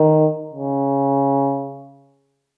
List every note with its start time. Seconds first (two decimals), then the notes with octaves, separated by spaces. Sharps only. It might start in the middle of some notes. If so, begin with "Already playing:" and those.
Already playing: D#3
0.53 C#3